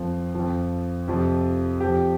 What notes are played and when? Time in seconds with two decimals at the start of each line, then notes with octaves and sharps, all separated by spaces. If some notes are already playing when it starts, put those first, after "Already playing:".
Already playing: F2 F3
0.35 F2 F3
1.08 F2 C3 F3
1.80 F2 F3 G4